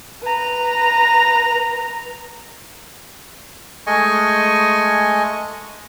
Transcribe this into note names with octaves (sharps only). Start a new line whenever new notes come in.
B4 A#5
G#3 A3 D#5 G#5 C#6